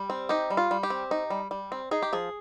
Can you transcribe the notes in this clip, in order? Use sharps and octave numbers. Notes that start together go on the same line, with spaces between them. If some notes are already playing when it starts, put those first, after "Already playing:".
Already playing: G3
C4
D#4 G4
G3
F4
G3
G4
C4
D#4
G3
G3
C4
D#4 G#4
G4
F3 G#4